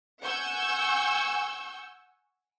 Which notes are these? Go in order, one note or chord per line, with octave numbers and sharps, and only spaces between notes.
F#5 G#5 C#6 E6 G6